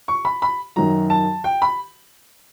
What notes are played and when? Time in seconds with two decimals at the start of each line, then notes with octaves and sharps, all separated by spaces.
0.08 C#6
0.25 B5
0.42 B5
0.76 F#2 D#3 F#3 A#5
1.10 A5
1.44 G5
1.62 B5